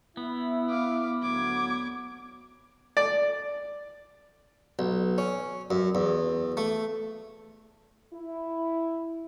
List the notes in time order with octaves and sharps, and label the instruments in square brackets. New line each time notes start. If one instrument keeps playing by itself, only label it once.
[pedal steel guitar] B3 [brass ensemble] E4
[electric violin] F5 D6
[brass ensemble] D2 F#3 [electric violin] D6 G#6
[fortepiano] D5
[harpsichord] B1
C#4
F#2
E2
A3
[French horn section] E4